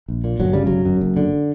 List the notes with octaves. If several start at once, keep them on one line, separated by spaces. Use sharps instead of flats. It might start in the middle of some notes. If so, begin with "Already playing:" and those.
A#1
A#2
G1 F#3
C#3 G3
G1 F#3
F#2
F#1
D3